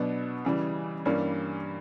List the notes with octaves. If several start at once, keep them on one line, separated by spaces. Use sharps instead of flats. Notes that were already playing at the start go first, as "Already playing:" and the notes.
Already playing: B2 F#3 B3 D4
C#3 E3 G3
G2 E3 G3 A#3 C#4